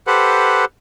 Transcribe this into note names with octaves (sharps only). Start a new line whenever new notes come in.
G4 A4 B4 C5 F#5